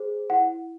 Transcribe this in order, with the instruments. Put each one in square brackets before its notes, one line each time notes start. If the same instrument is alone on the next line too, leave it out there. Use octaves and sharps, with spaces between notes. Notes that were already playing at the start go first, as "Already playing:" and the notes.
Already playing: [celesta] G#4 C5
E4 F#5